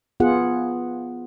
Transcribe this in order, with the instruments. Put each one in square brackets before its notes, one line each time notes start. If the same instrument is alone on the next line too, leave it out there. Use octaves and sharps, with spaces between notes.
[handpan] B3 F4 G#4 F#5